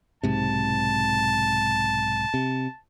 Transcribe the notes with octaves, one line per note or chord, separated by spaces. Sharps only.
B1 G#2 C3 A5
C3